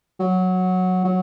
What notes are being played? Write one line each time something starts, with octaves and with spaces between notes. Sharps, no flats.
F#3
F#3